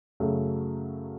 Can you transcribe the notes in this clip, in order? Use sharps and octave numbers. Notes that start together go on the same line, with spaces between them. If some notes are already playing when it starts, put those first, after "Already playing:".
F#2 C#3 F#3 A3